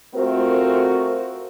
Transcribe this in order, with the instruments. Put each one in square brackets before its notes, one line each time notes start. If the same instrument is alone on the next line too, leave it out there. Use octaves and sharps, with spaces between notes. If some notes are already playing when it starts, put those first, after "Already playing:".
[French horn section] A3 C4 F4 F#4 A#4 C5